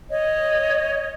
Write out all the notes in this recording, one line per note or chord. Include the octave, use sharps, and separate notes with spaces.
C#5 D#5